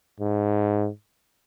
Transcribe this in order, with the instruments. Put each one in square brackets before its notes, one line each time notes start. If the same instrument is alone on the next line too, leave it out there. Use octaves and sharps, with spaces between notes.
[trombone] G#2